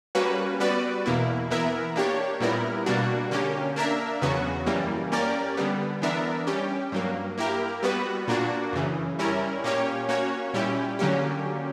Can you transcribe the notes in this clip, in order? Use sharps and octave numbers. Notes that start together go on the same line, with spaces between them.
G3 A#3 C#4 F#4 B4
G3 B3 F#4 B4 D5
E2 B2 A#3 E4
E3 B3 E4 A#4 E5
A#3 D4 G4 C#5
A#2 G3 B3 E4 A#4
B2 G3 A#3 D4 F#4
D3 A#3 C#4 G4
A#3 D4 A#4 E5
E2 C#3 F#3 B3 F#4
F#2 E3 G3 A#3
A#3 C#4 G4 A#4 D5
D3 G3 B3
E3 B3 D4 A#4 E5
G3 C#4 G4
G2 F#3 A#3
A#3 E4 G4 A#4
G3 B3 F#4 B4
A#2 A#3 D4 F#4
F#2 C#3 E3
G3 C#4 E4 A#4
A#2 A#3 C#4 G4 C#5
A#3 C#4 F#4 C#5
A#2 G3 C#4 E4 G4
D3 F#3 A#3 C#4 G4